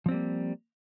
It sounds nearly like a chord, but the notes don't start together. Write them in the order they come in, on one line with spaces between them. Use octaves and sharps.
F3 C4 G3 A#3